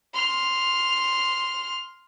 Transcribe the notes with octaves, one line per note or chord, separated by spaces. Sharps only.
C6 F6